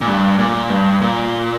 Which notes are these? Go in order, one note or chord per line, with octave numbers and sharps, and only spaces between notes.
A#2
G2
A#2
G2
A#2